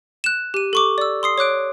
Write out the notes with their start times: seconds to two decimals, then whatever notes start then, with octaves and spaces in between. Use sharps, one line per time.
0.24 F#6 E7
0.54 G4 D#7
0.73 A4 C#6 D6
0.98 D5 E6
1.23 C6 D#6 C7
1.38 C#5 D6 F#6 D7